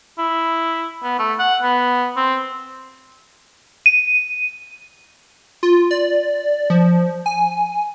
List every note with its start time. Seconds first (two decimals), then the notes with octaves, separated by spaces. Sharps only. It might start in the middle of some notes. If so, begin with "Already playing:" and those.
0.18 E4
1.03 B3
1.19 A3
1.39 F#5
1.62 B3
2.17 C4
3.86 D#7
5.63 F4
5.91 D5
6.70 F3
7.26 G#5